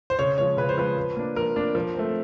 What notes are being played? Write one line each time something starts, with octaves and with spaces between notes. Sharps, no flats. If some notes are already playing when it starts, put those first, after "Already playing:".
C5
C#3 C#5
F3 G#3 C#5
C#3 B4
C5
F3 G#3 B4
F3
A#3 D4
F3 A#4
A#3 D4
F3
A3 C4